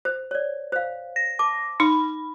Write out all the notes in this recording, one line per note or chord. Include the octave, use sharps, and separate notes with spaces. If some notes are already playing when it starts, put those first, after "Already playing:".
C5
C#5 D5
C5 F5
A#6
A5 D6
D#4 B5